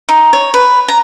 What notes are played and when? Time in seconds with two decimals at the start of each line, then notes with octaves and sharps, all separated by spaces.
0.09 D#4
0.33 C#5
0.54 B4
0.88 A#5